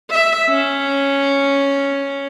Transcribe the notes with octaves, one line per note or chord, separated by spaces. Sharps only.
E5
C#4